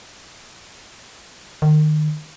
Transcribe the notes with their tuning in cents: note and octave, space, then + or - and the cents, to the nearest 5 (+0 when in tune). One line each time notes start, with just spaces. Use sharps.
D#3 -30